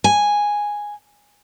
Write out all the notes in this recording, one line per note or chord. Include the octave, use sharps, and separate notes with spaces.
G#5